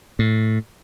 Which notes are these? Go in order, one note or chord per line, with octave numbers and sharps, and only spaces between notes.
A2